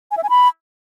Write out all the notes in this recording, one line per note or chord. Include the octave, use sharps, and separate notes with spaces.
G#5
E5
G#5
B5